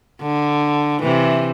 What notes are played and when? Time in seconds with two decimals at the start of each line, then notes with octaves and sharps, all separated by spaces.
0.22 D3
1.02 C3 E3